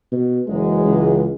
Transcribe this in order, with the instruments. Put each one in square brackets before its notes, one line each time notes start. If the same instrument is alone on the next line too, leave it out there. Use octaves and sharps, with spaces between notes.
[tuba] B2
[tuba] F#1 [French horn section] E3 F#3 G#3
[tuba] C#2